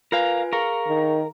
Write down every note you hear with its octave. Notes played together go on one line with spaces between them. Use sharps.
F4 A#4 B4 F5 G#5
G#4 A#4 F5 C#6
D#3